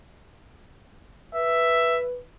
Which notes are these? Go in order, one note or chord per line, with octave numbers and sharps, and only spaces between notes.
B4 E5